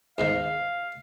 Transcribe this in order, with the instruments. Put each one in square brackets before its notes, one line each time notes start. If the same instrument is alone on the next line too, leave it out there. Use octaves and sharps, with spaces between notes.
[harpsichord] E2 G#2 D#3 [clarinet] F5